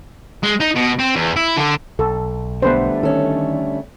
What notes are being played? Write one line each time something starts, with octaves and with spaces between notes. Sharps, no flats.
G#3
D#4
B2
C4
E2
E4
D3
B1 A4
D3 G3 A3 B3 B4 C5
D#3 C#4 A4